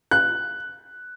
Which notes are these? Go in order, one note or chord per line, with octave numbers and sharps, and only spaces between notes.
F#6